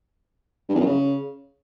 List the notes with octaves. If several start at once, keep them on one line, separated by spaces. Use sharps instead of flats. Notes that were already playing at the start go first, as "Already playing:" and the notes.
G2
E2
F#2
C#3